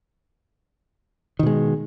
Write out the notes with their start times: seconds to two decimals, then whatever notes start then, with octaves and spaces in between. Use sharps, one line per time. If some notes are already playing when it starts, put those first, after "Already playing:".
1.39 D#3
1.43 B2
1.46 G#3